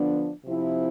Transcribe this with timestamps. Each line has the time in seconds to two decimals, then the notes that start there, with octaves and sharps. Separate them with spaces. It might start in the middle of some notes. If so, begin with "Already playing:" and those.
Already playing: D3 F3 B3 D4
0.46 C3 F3 C4 E4